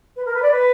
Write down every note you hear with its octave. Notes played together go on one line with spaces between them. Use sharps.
B4
A#4
B4
D5
B4